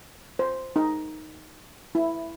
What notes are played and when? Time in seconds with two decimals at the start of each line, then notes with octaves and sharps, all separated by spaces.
0.39 C5
0.76 D#4
1.95 E4